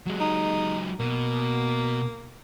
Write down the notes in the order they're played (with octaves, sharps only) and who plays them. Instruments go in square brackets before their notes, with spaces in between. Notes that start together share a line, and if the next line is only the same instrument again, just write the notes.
[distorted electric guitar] F#3 G#3
[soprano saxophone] D#4
[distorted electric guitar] B2 [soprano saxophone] A#3